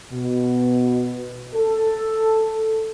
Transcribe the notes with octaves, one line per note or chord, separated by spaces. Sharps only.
B2
A4